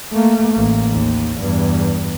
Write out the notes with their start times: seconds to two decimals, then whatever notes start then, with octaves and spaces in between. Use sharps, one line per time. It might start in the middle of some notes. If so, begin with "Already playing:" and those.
0.13 A3 A#3
0.54 A1 A#3
0.90 D#2
1.39 E2 G2